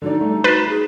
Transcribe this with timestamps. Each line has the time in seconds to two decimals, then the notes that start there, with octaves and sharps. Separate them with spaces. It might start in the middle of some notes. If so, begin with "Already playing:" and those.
0.02 D3 F#3 D#4 D5
0.21 G3 A3
0.44 F#4 B4 A6 C7 E7
0.69 D#4 G#4